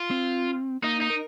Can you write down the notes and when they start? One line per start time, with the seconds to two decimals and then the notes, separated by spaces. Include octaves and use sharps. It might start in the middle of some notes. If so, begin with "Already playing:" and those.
Already playing: F4
0.11 C4
0.83 A#3 D#4
1.02 D#4
1.10 A#4